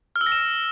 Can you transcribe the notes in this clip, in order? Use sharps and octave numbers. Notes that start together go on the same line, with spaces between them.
F6
E6
A#6
E7